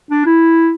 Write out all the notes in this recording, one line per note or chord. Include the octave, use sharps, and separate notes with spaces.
D4
E4